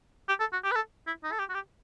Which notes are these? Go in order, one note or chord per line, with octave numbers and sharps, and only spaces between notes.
G4
A4
F#4
G4
B4
A4
E4
D#4
A4
G4
F#4
G4